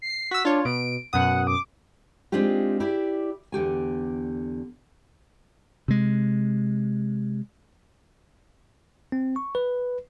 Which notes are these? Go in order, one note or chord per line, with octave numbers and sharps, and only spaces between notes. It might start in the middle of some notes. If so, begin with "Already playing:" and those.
C7
F#4 E6 B6
D4 F4 C#5
B2 D7
F#2 B2 F#5 D#6
D6
G#3 C4 D4 D#4 F4 G4
E4 G4 D5
E2 D3 G4 G#5
C3 G#3
C4
C#6
B4